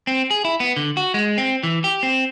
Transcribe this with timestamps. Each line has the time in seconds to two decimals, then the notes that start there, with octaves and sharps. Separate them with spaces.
0.07 C4
0.31 G#4
0.45 E4
0.60 B3
0.77 D3
0.97 F#4
1.14 G#3
1.38 C4
1.63 E3
1.84 G4
2.03 C4